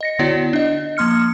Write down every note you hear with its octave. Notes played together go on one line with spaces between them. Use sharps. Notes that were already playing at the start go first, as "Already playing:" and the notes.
D#5 A#6 C#7
D3 B3 E4 F#4 C#5 D5
D4 D#5
F3 A#3 C6 F6 C#7